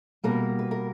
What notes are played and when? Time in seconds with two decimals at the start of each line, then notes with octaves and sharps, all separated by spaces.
0.24 B2 G3 A#3 A#4
0.59 B4
0.71 A#4